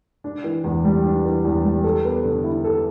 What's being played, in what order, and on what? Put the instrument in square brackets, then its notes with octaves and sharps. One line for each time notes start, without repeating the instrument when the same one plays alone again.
[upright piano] D4
E3
E2
G3
D4
E3
E2
G3
A4
B3
D3
E4
A4